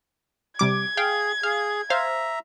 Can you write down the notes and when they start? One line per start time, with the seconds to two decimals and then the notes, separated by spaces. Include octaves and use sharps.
0.59 C3 G3 D6 G#6
0.97 G#4 F5 G5
1.43 G#4 F5
1.90 C5 E5 F5 A#5